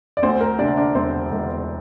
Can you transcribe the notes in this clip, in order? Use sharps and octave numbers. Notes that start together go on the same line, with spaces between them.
D5
D2 C4 C5
A#4
C3 D4 D5
D4 D5
E1 C4 C5
E1